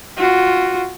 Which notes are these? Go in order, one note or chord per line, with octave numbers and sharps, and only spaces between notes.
F4 F#4